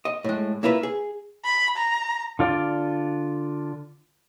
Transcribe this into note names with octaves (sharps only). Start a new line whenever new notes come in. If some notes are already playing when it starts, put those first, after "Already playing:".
D#5
A2 G#3
A#3 E4 F4 B4 D5 E5
G#4
B5
A#5
D3 F4 D5